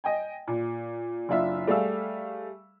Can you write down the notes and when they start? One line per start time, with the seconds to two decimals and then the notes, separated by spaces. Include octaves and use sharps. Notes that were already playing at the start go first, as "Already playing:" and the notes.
0.04 D#5 G5 G#5
0.48 A#2
1.29 F#1 D4 F4 E5
1.67 G3 A3 G#4 E5 F5 E6